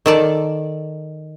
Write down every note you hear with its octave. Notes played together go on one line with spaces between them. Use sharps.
D#3 A4 D5